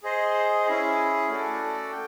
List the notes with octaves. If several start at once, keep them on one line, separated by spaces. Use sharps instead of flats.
G#4 C5 D#5
C#4 E4 G#4
A3 C#4 F#4 A4 D5
G5